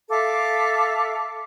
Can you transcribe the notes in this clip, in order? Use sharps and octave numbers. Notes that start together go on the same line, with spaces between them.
A4 E5 F5 D6